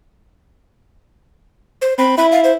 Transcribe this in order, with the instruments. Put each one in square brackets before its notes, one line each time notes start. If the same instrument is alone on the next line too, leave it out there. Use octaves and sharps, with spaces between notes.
[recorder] C5
[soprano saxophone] C4 [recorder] B5
[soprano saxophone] E4 [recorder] B5
[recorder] F5
C5